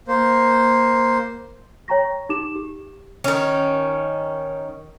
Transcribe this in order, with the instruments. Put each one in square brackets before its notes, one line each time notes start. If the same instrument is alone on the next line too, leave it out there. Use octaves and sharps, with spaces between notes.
[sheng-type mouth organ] A#3 C5
[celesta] C#5 G5 A#5 C#6 A#6
D#4 G4 D6 E7
G4
[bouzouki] D#3 C#4